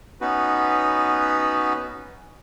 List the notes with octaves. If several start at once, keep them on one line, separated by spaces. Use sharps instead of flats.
B3 C#4 D#4 F#4 B4